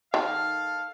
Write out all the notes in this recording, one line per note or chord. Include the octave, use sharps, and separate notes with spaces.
D#3 A4 F5